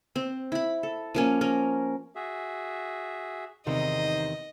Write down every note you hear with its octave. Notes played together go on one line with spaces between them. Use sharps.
C4
E4 B5
A4
F3 A#3 C#4
C#4 A#4
F#4 G#4 E5
E2 G#2 C3 D#3 C5 D#5